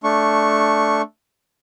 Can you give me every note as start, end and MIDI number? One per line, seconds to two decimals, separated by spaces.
0.04 1.02 57
0.04 1.02 62
0.04 1.02 85